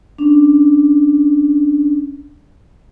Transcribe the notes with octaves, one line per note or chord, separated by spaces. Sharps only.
C#4 D4